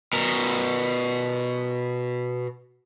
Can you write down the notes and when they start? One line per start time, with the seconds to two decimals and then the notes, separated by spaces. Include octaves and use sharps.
0.13 B2 A#4